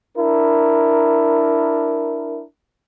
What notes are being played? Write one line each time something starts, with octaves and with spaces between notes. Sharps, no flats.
D4 E4 A#4